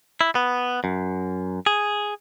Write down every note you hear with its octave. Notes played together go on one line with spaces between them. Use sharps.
E4
B3
F#2
G#4